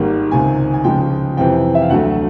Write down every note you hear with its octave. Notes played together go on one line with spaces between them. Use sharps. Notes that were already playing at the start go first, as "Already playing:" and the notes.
Already playing: G#1 G#2 D#3 G3 A#3
C#2 C3 D#3 G#5
G#5
C#2 C#3 F3 G#3 G5
F2 C3 E3 G5
E5
F5
D2 D3 F#3 A3 F#5